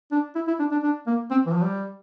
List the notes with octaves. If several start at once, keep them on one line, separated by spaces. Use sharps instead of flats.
D4
E4
E4
D4
D4
D4
A#3
C4
E3
F3
G3